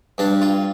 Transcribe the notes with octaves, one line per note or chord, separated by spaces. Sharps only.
G2 D4
F4